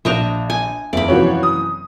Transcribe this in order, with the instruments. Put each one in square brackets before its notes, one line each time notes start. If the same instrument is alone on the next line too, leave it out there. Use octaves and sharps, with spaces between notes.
[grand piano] A#1 G6 F7 [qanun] D4 D#5 E5
[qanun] G#5
[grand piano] F#1 E2 E5 [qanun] D5 B5
[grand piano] F#2 C3 E3 [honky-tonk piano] F3 F#4 C#5
[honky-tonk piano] D#6